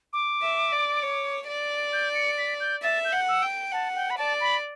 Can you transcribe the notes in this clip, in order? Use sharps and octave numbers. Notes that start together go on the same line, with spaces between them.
D6
E5
D5
C#5
D5
G6
C#7
B6
G6
E5 A6
G6
F#5
E6
G5
F#5 A5
G5
B5
D5 A5
B5